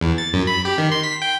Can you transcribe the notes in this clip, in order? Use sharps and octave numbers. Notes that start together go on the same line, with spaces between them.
E2
A6
F#2
B5
G4
D#3
C6
B6
G5